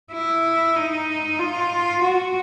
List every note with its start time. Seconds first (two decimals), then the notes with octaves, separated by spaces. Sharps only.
0.12 E4
0.76 D#4
1.39 F4
2.02 F#4